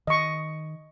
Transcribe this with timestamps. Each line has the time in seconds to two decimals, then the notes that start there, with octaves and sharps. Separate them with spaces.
0.07 D#3 D#5 C#6